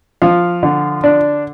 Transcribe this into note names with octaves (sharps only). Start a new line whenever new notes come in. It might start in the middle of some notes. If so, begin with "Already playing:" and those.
F3 F5
D3
D4